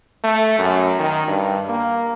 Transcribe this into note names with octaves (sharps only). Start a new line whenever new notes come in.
A3
F#2
D#3
G2
A#3